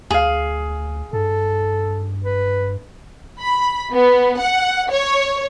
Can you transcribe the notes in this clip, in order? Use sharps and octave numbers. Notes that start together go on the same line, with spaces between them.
D2 G#4 F5
G2 A4
B4
B5
B3
F#5
C#5